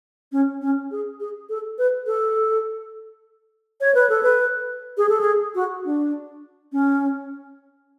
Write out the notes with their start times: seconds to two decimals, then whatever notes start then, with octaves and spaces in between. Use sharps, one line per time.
0.32 C#4
0.61 C#4
0.91 G#4
1.20 G#4
1.49 A4
1.78 B4
2.06 A4
3.81 C#5
3.95 B4
4.09 A4
4.23 B4
4.97 G#4
5.09 A4
5.21 G#4
5.55 F#4
5.85 D4
6.72 C#4